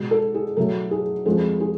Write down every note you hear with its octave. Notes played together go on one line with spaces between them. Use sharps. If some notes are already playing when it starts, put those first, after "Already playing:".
Already playing: B2 G#3
A4
G#4
B2 F#3 A3 A4
G#4
F2 F3 G#3 A4
G#4